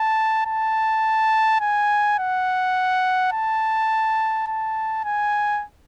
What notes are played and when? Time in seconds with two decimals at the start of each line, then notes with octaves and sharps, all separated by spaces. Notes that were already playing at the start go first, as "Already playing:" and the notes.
Already playing: A5
0.46 A5
1.61 G#5
2.19 F#5
3.32 A5
4.47 A5
5.04 G#5